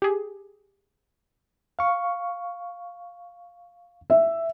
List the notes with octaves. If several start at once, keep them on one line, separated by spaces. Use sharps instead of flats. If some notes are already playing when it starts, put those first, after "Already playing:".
G4 G#4
F5 C#6
E5